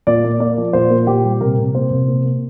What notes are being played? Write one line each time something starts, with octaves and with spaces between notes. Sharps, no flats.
A#2 D5
A#3
A#3 D5
F3
A#2 C5
A#3
A#2 G4
G3
C3 A#4
C3
A#3 C5
C3
A#3
A#3